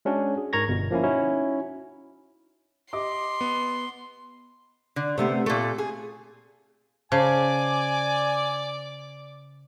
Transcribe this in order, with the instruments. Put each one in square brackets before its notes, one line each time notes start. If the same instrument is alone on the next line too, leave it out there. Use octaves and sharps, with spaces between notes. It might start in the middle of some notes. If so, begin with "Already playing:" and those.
[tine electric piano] G#3 C#4 D4 F#4
G#4
G#2 A#4 A#5 C#6 G#6 A#6
G1 B2
F3 A#3 C#4 E4
C#4 D#4 E4 F#4
[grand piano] G4 D#5 D6 [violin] C6
[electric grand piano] B3
[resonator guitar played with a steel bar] D3
[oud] C3 A3 B3 [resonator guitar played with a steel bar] C5
[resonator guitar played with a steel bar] A#2 A3 [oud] A4
[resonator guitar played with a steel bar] G#4
[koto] C#3 [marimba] C5 A5 [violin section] D5 D6 [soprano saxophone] G#5